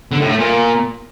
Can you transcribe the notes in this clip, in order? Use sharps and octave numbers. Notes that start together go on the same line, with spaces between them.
D3
A2
A3
A#2